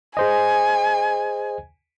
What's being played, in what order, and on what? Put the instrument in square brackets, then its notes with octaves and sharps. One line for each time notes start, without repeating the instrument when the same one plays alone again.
[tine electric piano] G#4 C5 D#5 [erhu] G#5